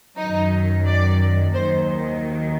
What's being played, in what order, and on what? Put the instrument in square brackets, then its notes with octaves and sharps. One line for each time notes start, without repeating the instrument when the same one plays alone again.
[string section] F#2 D#3 F#3 D#4
D5
D#2 D#3 F#3 C5